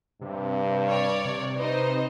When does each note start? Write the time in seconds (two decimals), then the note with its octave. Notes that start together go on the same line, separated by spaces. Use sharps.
0.21 G2 C3
0.87 C#5 D5
1.25 C3
1.56 D#4 B4 C5 D#5